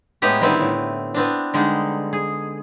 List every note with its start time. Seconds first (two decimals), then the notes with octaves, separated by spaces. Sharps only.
0.22 A2 G#3 B3 E4 G4 A#5
0.41 D3 D#3 G3 B3 C4 E4
0.61 A2
1.14 B3 C4 D4
1.54 D3 G3 G#3 D#4
2.13 G#4